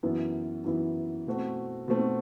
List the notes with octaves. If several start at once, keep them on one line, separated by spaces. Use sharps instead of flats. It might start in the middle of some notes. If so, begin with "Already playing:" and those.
F#2 E3 B3 E4
F#2 E3 B3 E4
B2 A3 C4 F#4
B2 A3 C4 F#4